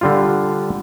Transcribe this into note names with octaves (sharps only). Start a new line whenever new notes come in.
D3 G3 F4